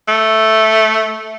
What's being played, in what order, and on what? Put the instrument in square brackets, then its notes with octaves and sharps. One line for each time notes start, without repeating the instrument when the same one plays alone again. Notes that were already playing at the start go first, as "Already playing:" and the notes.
[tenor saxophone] A3